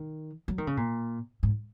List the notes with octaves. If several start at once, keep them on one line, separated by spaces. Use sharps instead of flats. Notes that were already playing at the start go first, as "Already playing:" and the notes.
Already playing: D#3
F#3
D#3
C#3
A#2
G#2